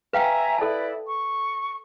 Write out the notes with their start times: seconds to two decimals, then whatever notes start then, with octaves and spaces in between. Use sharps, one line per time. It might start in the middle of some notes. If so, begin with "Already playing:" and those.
0.13 B4 E5 F5 G5 G#5 A#5
0.58 E4 A4 B4 D5 A5
1.08 C#6